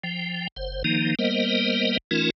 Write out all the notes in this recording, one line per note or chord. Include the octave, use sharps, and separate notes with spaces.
F3 G5
F#1 C5
D#3 F3 A#3 D#4
G3 A#3 B3 A#4 C5 D#5
E3 A3 C#4 D#4 F4 A#4